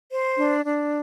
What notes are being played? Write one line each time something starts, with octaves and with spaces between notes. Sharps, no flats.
C5
D4
D4